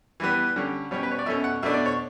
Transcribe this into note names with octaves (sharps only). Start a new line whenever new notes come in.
E3 G3 B3
D3 G3 C#4
B2 G3 C#4 C#5
B4
C#5
D5
B2 A3 C#4 E5
F#5
B2 A3 D4 E5
D5
C#5